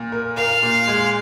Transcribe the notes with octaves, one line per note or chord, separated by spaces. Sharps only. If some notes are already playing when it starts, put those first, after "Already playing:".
Already playing: A#2
A#4
A#4 F5
A#2
G#3